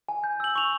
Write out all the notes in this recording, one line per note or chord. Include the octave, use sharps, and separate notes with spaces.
G#5
G6
E6 F#7
C#6 F7